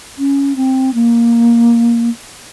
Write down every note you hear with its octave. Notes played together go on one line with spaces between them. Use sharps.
C#4
C4
A#3